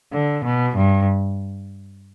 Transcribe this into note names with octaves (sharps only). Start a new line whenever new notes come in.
D3
B2
G2